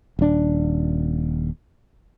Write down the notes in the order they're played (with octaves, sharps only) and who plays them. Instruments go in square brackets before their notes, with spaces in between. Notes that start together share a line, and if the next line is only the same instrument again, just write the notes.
[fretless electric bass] D#1 D4